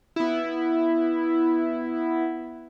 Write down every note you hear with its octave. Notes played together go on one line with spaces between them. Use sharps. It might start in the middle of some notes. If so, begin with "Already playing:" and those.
B3 E4